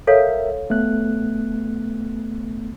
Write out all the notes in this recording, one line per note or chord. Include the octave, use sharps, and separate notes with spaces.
A4 A#4 C#5 E5 F5
A3 B3 F#6